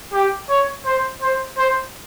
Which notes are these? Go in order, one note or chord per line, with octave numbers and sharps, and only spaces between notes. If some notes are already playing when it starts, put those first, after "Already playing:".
G4
C#5
C5
C5
C5